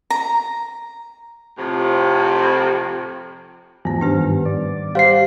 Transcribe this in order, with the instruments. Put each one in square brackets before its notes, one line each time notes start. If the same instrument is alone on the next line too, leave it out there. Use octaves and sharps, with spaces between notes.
[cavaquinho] A#5
[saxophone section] F2 A2 C3 F3
[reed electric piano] E2 F3 [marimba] G#2 A3 B3
[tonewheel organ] G2 B3 [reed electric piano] D#3 [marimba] D4 G4 C5
[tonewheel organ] D5
[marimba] G3 F#5 [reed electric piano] G4 C5 [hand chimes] F5 C7